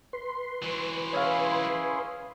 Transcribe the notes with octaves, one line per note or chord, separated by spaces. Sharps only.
B4 C6
E3 F#3
C#4 E4 G#4 C#5 F5